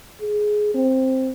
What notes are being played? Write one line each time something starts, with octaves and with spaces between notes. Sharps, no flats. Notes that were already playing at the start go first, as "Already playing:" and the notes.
G#4
C4